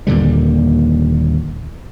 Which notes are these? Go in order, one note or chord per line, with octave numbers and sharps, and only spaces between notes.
D#2 A#2 D3 G3